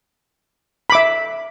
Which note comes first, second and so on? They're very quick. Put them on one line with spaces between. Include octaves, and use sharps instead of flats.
B5 D6 E5